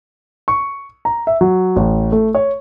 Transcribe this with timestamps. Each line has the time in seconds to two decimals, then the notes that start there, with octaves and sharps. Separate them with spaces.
0.48 C#6
1.05 A#5
1.27 E5
1.41 F#3
1.76 A1
2.12 A3
2.35 C#5